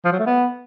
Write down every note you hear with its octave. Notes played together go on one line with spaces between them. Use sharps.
F3
F#3
A3
B3